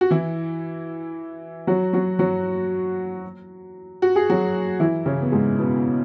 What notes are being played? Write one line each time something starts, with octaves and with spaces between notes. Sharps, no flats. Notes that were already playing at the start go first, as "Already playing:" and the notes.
F#4
E3 E4
F#3 F#4
F#3 F#4
F#3 F#4
F#4
G#4
F#3 F#4
E3 E4
C#3 C#4
B3
G#2 G#3
B2 B3